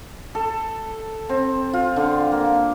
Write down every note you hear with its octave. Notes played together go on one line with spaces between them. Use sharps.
A4
C4
F4
D3
A#3